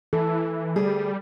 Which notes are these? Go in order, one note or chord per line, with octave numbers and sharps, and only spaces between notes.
E3 A4
D2 G3 G#4